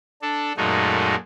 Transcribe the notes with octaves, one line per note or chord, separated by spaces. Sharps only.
D4 A4
F#2 A#2 G#3 A3 D#4 F#4